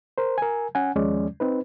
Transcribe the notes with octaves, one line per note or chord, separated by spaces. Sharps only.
A#4 C5
A#4 G#5
C#4 F#5 G#5
D#2 F3 G#3 C#4 D5
C4 D#4 B4